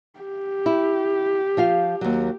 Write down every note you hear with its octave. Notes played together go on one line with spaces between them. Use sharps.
G4
E4
F3 F4 F5
D#2 F#3